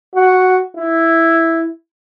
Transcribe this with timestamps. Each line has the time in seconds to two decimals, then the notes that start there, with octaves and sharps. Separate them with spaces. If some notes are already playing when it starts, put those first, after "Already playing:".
0.15 F#4
0.77 E4